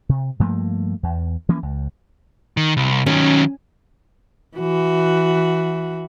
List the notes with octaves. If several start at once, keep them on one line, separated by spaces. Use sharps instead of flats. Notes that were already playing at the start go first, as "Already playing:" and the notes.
C3
G2 F3 A3 A#3
E2
E3 F3 A#3 C#4
C#2
D#3
C2
D#3 F#3 C#4
E3 F#4